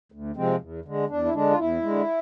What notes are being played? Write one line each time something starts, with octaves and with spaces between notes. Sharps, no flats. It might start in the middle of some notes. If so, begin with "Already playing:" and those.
D2
C3 F3 G#3 C4
E2
D3 G#3
E2 D4
E4
D3 G#3 D4
F4
E2 E4
D3 G#3